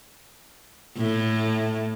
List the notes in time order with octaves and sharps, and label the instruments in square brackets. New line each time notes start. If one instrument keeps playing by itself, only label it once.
[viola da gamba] A2